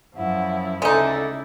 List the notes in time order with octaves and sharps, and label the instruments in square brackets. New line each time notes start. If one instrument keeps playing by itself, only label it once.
[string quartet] F#2 F3 E4 [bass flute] F#5
[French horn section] D2 A4 [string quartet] C#3 E4 D5 [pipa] G#3 D#4 [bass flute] E5